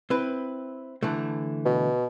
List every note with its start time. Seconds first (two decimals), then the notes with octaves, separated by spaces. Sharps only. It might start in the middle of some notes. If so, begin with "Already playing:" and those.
0.10 C4 E4 B4
1.03 D3 E3 A3
1.65 B2